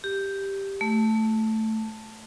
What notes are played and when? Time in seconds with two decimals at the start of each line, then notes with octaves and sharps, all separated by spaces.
0.04 G4
0.81 A3